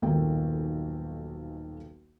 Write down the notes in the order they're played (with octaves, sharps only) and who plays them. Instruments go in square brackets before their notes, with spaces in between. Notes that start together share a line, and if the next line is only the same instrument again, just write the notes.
[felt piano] D#1 B1 D#3 A4 G5